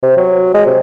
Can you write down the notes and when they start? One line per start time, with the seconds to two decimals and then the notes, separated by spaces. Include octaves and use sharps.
0.03 C3
0.17 F#3
0.54 G#3
0.66 C3